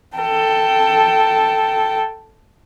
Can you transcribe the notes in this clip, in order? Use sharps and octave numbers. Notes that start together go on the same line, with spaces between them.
A4 G5